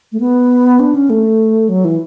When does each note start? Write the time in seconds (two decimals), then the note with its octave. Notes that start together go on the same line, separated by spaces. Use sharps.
0.12 A3
0.20 B3
0.80 D4
0.95 C#4
1.10 A3
1.69 F#3
1.85 E3